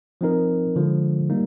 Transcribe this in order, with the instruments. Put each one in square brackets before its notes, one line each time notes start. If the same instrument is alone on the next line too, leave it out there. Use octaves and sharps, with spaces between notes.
[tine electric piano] F3 C4 D#4 A#4
D3 F3 G#3
G3 A#3 D#4